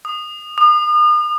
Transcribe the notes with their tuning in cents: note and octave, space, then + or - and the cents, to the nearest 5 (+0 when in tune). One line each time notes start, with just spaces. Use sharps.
D#6 -20
D#6 -40